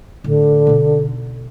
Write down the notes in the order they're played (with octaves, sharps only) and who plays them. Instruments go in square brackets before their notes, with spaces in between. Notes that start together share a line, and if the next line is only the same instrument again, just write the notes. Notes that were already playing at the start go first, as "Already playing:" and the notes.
[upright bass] A2 [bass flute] D3
[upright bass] B2 D#4